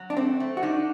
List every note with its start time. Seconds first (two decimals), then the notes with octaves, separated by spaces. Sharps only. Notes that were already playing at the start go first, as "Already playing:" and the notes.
Already playing: F#3
0.10 D4
0.17 A3 C4
0.40 A3
0.57 F#4
0.63 D4 D#4